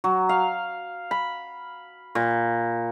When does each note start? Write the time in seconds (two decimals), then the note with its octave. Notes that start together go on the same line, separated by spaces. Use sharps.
0.04 F#3
0.29 F5
1.11 B5
2.15 A#2